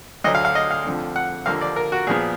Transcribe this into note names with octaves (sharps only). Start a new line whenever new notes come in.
D2 D3 F#3 D#5
F5
F5
D#5
F5
F2 D3 F3
F#5
D#2 D3 F3 A#3 F5
D5
A#4
F#4
A#2 F3 B3 G#4